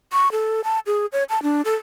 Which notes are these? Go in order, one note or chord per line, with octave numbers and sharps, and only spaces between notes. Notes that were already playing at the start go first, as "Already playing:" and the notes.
C#6
A4
A5
G#4
C#5
A5
D4
A4